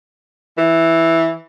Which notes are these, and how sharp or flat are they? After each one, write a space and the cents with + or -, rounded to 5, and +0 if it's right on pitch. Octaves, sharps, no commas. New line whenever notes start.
E3 -5